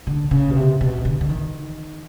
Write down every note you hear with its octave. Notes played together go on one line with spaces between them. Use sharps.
D3
C#3
B2
C3
B2
D3
D3
D#3